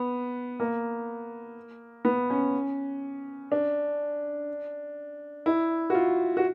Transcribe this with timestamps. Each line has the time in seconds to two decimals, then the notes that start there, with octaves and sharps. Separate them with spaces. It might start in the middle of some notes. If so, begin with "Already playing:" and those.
Already playing: B3
0.60 A#3
2.05 B3
2.30 C#4
3.52 D4
5.46 E4
5.90 F#4
5.95 F4
6.37 F#4